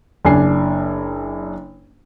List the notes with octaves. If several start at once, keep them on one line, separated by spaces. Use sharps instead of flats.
F#1 D4 G#5 C7